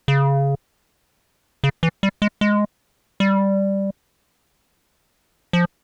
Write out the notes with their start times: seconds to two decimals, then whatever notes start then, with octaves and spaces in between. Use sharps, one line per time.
0.08 C#3
1.64 C#3
1.83 E3
2.03 G3
2.22 G#3
2.41 G#3
3.20 G3
5.53 F3